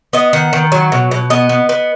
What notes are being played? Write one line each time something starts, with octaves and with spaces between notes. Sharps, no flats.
B3 D#5
D#3 F#5
D#3
F#3
B2
B2
B3 D#5
B3
B3